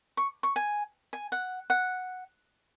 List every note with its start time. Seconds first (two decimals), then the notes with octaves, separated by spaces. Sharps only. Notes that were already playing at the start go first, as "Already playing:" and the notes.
0.17 C#6
0.43 C#6
0.56 G#5
1.13 G#5
1.32 F#5
1.70 F#5